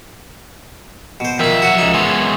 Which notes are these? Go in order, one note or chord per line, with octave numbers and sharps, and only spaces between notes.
B2 C5
D#3 F3 F4 E5
F#3 F#4
C#2 D#4
E3 G#3 B3 C#5